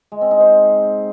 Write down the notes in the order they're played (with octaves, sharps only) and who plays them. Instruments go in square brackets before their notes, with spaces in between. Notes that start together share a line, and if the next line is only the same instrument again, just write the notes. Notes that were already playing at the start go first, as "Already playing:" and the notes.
[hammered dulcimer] G#3
C4
D#4
C5